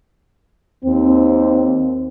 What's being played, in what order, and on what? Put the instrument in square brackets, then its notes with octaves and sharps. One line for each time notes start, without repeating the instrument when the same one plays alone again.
[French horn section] D#2 C4